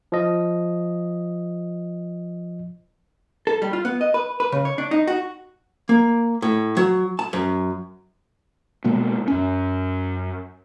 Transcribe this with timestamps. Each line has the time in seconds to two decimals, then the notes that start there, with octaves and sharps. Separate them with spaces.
0.12 F3 D#5
3.47 A4
3.62 G3
3.73 F4
3.85 B3
4.01 D#5
4.14 B4
4.40 B4
4.52 C#3
4.65 C#5
4.78 D4
4.91 D#4
5.07 F#4
5.89 A#3
6.42 A2
6.77 F#3
7.19 A5
7.33 F#2
8.84 B2 G#3 A#3 B3
9.28 F#2 C#4